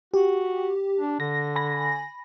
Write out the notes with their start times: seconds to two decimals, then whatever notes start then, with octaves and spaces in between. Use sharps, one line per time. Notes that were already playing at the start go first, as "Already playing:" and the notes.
0.14 F#4 G4
0.98 D4
1.20 D3 A#6
1.56 G#5 B5 A#6